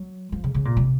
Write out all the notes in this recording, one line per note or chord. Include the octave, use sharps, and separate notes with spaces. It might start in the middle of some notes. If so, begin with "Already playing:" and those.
Already playing: F#3
F3
C#3
C#3
A#2
C3